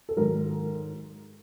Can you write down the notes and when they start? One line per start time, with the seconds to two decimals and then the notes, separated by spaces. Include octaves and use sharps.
0.09 A4
0.17 G#2 D#3 F#3 A#4